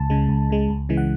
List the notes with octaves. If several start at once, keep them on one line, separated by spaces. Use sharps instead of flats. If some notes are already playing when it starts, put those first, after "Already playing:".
Already playing: C#2 A5
C#3 G#3
C#2
C#3 G#3
C#2
C#3 E3 G#3
F#5